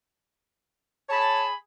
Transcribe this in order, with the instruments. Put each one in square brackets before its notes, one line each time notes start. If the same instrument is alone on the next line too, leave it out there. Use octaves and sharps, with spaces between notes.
[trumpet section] G#4 B5 [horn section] C#5 A5